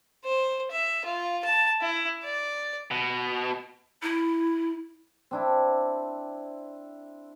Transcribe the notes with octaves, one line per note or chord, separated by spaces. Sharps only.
C5
E5
F4
A5
E4
D5
B2
E4
C4 D4 E4